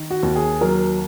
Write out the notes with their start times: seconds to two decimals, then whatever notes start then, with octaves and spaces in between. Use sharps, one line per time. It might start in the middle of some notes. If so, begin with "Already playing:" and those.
Already playing: D#3
0.10 F#4
0.23 D#2
0.36 G#4
0.61 F#3 A#4